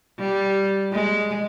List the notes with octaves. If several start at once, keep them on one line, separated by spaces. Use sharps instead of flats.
G3
G#3